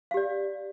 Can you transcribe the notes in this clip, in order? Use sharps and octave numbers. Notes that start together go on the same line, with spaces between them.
G4 D5 F5